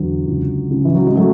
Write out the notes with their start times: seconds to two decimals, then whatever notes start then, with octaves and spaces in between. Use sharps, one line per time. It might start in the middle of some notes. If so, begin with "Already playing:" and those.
Already playing: E2 D3 F#3
0.26 C#2
0.71 C#3
0.85 E3
0.95 F#3
1.06 G#3
1.15 F#3 A3